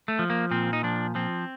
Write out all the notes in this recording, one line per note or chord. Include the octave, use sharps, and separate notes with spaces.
A3
F3
A#3
A#2 C4
D#4
F3 D4
F3 C4